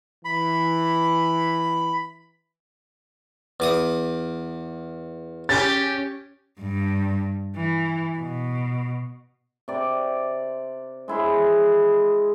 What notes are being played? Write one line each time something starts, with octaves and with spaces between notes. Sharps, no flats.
E3 B5
E2 D6 D#6
C#4 G4 A6
G2
E3
B2
C3 D5
G#3 E4 G#4 C#5